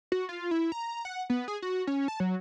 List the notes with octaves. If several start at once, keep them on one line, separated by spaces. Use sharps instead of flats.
F#4
F4
E4
A#5
F#5
B3
G#4
F#4
C#4
A5
F#3